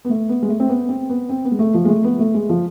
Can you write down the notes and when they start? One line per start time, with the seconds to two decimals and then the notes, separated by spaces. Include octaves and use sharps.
0.05 B3
0.09 A3
0.29 B3
0.42 G#3
0.48 A3
0.60 C4
0.69 B3
0.89 C4
1.09 B3
1.29 C4
1.45 B3
1.51 G#3
1.59 A3
1.74 F3
1.85 G#3
1.89 A3
2.04 B3
2.19 A3
2.34 G#3
2.49 F3